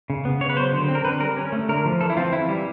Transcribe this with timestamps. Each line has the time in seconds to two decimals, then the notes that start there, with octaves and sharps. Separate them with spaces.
0.10 C#3
0.25 B3
0.41 C#3 C#5
0.49 B4
0.57 F#3 C5
0.72 D3
0.88 C4
0.95 A#4
1.05 D3 B4
1.21 G3 A#4
1.37 C#4
1.52 A3
1.69 D3 A#4
1.85 F3
2.01 E3 A4
2.10 E4
2.17 C4 F4
2.32 E3 E4
2.49 G3